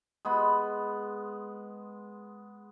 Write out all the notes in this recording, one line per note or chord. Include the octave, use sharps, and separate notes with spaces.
G#3 B3 B5